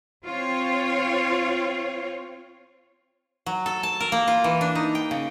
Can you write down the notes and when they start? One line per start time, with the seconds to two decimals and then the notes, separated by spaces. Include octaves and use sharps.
0.25 C4 F4 C#5
3.46 F#3
3.66 A4
3.83 A5
4.00 A#4
4.12 A#3
4.28 F4
4.44 E3
4.61 D4
4.75 D#4
4.95 G5
5.11 C#3